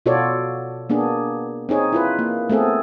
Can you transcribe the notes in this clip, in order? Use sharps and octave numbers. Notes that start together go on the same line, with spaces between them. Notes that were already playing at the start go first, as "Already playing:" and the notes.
B2 F4 F#4 A4 C#5 D5
A#3 B3 D4 G#4
C4 D#4 G#4 C#5
E4 F4 B4
A#3
A3 B3 C4 G#4 A4